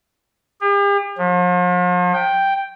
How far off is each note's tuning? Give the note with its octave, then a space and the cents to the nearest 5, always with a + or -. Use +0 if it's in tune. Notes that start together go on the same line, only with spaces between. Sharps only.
G4 +45
F3 +40
G5 +0